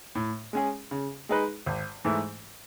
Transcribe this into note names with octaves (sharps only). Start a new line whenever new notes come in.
A2
G#3 C#4 G#4
C#3
G#3 D#4 G#4 B4
G#1
G#2 E3 A3